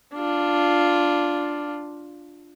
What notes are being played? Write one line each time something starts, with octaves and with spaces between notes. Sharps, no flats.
D4 F4